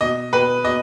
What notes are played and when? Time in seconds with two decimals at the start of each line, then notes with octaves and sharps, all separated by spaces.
0.01 B2 D#5
0.33 B2 B4
0.64 B2 D#5